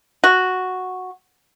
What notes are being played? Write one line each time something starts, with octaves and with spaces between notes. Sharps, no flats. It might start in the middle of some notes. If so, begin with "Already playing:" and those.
F#4